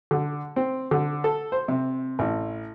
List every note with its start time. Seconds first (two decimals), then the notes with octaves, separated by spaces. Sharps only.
0.11 D3
0.56 C4
0.91 D3
1.24 A4
1.52 C5
1.68 C3
2.19 A1